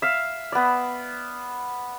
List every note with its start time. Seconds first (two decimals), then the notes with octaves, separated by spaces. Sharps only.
0.02 E5 F5
0.52 B3 D5